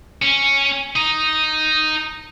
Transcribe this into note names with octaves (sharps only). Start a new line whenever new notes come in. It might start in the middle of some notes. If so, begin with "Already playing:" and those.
C#4
D#4